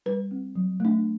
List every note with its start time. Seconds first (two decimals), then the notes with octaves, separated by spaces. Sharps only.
0.06 G3 B4
0.31 C4
0.56 F#3
0.80 A3 D4